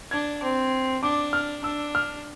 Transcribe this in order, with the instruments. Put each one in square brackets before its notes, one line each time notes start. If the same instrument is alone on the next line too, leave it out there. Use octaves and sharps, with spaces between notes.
[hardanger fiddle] D4 [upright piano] G#6
[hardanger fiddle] C4
[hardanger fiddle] D4 [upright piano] D6
[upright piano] F6
[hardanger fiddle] D4 [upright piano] E6
[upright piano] F6